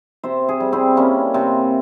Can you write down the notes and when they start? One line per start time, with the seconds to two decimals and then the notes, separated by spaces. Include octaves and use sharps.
0.23 C3 C5 E5
0.48 G#4 C5
0.60 G3
0.73 C4 E4
0.97 G3 A#3 C#4
1.34 C3 C4